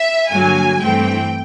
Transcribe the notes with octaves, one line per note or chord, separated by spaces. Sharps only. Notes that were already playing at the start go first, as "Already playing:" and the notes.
Already playing: E5
G2 D3 F#3 A#3 G#5
G2 E3 A3 C4 G5